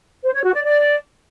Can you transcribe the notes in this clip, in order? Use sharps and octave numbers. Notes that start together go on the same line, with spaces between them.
C5
C#5
F#4
D5
D5